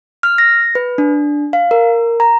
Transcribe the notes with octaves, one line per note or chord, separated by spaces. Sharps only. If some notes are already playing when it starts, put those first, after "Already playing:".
F6
A#6
B4
D4
F5
A#4
A#5